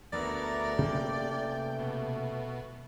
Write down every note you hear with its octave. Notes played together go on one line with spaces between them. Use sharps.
D2 A3 B3 A#4 D5
C3 A#3 C#4 G5
B2